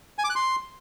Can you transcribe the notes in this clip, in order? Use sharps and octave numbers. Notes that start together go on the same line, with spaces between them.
G#5
D6
F#6
C6